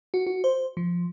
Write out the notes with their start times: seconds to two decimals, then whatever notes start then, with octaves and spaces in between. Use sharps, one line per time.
0.14 F#4
0.27 F#4
0.44 C5
0.77 F3